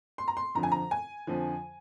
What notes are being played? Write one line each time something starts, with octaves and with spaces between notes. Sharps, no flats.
C6
A#5
C6
F2 D3 F3 A#5
G#5
A#5
G#5
F2 D3 F3